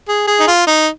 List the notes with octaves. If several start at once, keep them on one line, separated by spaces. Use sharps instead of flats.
G#4
G#4
D#4
F4
D#4